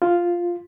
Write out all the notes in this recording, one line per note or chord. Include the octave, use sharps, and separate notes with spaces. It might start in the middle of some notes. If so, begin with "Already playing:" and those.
F4